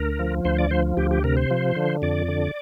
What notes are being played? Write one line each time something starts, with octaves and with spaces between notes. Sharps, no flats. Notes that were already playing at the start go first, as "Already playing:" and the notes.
Already playing: D2 A#4
F3
D2 C5
D5
F3 C5
D2 G4
G4
C3 A#4
C5
F3
D3
F2 D5
D3